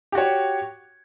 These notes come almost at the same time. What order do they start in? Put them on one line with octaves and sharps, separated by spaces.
G4 F#4 C#5